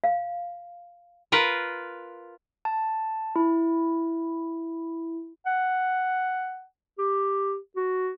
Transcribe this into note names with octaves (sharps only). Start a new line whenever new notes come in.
F5
F4 A#4 B4
A5
E4
F#5
G4
F#4